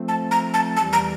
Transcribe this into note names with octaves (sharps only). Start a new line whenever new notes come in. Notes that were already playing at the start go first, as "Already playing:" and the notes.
Already playing: F3 A3 C4
A5
A#5
A5
E2 E3 G3 A5
A#5